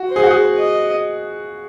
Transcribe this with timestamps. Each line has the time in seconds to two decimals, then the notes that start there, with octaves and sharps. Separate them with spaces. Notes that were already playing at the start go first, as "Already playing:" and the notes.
Already playing: F#4
0.08 C5
0.16 G#4
0.23 F#4
0.30 G#4
0.57 D#5